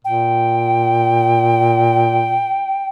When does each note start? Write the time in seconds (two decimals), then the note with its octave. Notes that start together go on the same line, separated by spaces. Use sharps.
0.05 A#2 G5